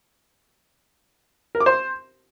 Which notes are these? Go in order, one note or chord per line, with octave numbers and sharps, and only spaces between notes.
A#4
D6
C5